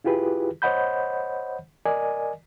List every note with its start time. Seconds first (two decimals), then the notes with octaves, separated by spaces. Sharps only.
0.04 E4 F4 G4 G#4 B4
0.62 C5 C#5 D#5 F#5 B5 G6
1.86 A#4 D5 D#5 G#5